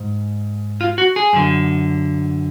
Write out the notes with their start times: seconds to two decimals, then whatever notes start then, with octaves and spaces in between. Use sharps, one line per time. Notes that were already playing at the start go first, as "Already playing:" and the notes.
Already playing: G#2
0.81 F4
0.98 F#4
1.16 G#4
1.33 F#2 D3